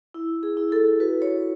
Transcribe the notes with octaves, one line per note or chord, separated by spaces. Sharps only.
E4
G#4
E4
A4
F#4 B4
C#5